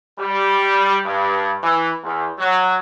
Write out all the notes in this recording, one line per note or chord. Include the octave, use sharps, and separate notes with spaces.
G3
G2
E3
E2
F#3